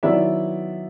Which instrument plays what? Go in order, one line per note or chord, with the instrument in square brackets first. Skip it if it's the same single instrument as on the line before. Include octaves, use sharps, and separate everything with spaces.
[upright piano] D#3 F#3 B3 E4 D5 E5